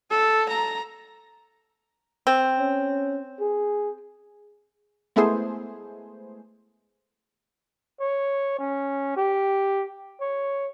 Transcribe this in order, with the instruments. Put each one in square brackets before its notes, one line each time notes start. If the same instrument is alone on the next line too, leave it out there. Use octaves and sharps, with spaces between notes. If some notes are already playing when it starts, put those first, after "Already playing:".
[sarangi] A4
A#5
[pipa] C4
[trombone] C#4
G#4
[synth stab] G#3 A3 B3 E4 G#4 C5
[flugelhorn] C#5
C#4
G4
C#5